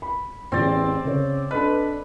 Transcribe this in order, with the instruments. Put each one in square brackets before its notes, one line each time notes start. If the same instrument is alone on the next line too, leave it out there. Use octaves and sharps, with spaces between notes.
[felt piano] B5
[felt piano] A1 E2 [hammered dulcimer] C4 D5
[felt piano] C#3 C#5
[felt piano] D4 A4 D#5 [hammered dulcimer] B4